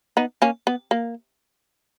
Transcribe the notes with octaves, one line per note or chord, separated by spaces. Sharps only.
B3 D#4
A#3 C#4
B3
A#3